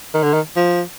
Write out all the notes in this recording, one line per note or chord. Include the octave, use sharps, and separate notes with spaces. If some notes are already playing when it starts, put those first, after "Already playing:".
D#3
D3
D#3
F3